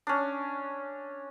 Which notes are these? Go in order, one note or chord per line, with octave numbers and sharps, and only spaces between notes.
C#4 D4